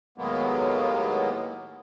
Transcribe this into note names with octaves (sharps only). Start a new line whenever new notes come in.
D#2 A2 F#3 G#3 A#3 B3